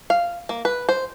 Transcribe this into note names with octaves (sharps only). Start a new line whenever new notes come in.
F5
A#3
B4
C5